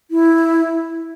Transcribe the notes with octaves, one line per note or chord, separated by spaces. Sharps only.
E4